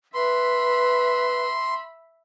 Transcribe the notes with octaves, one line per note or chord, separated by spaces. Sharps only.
B4 E5 B5 C6